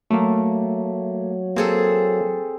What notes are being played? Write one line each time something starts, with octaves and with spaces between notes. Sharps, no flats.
F#3 A3 A#3
A#3 C4 G#4 A4